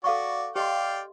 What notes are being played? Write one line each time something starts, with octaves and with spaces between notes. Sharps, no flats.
F#4 A4 D5 F5 C#6
G4 D5 D#5 F5 G5 C6